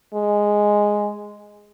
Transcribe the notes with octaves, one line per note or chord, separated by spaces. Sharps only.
G#3